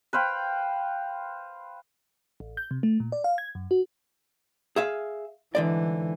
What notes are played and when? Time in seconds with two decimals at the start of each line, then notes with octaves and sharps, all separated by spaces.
0.13 B4 C5 F5 G5
2.40 A1
2.57 G6
2.71 C3
2.83 A3
3.00 A#2
3.12 D5
3.24 F5
3.38 G#6
3.55 F#2
3.71 F#4
4.76 G#4 E5 F5
5.55 G#2 D3 E3 D5